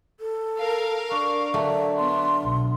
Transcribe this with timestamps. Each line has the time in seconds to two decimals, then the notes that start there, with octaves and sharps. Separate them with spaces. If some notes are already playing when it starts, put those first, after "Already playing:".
0.20 A4
0.59 A#4 F5
1.11 D4 C#6
1.54 D3 F#3 A3 E5
1.97 B3 D4 C6
2.40 B1